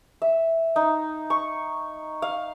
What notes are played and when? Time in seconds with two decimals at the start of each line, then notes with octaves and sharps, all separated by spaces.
0.22 E5
0.76 D#4
1.30 C#6
2.22 F5